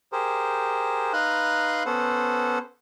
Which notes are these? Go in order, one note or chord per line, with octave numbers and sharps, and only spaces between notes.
G4 G#4 A#4 C5
D#4 B4 F5 A#5 C6 F#6
B3 C#4 A4 C5 F#5